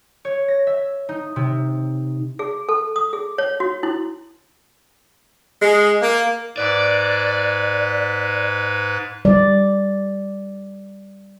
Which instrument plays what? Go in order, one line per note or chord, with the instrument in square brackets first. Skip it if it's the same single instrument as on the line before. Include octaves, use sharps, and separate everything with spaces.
[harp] C#5
A#6
E5
D#4
C3
[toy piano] G#4
A4
D#6
G#4
C#5
F#4
E4
[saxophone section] G#3
A#3
[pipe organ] G#2 B4 [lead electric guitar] D5
[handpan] G3 D5